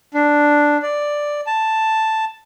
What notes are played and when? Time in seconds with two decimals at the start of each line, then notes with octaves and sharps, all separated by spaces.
0.14 D4
0.83 D5
1.47 A5